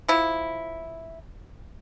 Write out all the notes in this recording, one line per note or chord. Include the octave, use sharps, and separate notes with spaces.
F3 E4